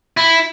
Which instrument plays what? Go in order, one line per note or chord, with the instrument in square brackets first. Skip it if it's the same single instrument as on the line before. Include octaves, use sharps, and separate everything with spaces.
[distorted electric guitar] E4